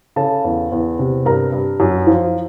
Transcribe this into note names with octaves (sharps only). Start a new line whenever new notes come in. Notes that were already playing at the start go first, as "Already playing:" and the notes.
C#3 A4 A5
E2
E2
C3
G2 A#4 A#5
G2
F#2
F3